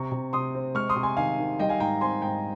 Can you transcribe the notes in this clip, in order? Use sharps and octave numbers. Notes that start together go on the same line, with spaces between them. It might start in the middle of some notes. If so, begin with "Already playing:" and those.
Already playing: C3 A#5 C#6
C3
C3 C6 D#6
C4
G#3 C#6 F6
C6 D#6
C3
G#5 C6
D#3 F5 G#5
D#3
G3 D#5 G5
F5 G#5
G#2 G5 A#5
C4 G#5 C6
G#2 G5 A#5